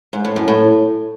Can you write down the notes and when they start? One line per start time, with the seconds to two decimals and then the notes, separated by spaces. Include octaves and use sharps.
0.13 G#2
0.25 A2
0.36 F#2
0.48 A2